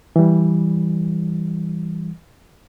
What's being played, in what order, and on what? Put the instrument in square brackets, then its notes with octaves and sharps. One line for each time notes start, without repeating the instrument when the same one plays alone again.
[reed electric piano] E3 G3